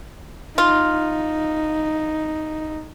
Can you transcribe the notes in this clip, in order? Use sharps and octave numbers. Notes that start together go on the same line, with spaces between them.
D#4 F4